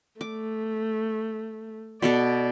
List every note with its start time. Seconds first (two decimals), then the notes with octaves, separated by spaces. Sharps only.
0.21 A3 D6
2.02 B2 B3 A4 D5